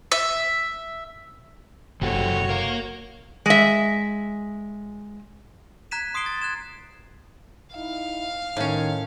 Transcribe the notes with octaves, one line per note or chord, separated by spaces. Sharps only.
E5
F#1 C3 F#4 G4 A4 C#5
A#4 F5
G#3 E5
A#5 F#6 G#6 B6 D#7 E7
C6 D#6 C7 D7 G7
A6
F#6 G#6 E7
D#4 E4 F5
A2 D#3 C#4